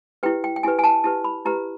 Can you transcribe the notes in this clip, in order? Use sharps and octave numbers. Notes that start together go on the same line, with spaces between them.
E4 G4 B4 G5
G5
G5
E4 G4 B4 G#5
G#5
A5
E4 G4 B4 A5
B5
E4 G4 B4 A#5